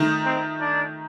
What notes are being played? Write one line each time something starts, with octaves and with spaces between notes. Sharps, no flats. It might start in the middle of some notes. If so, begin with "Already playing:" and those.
Already playing: D#3 A3 D#4
C4
D4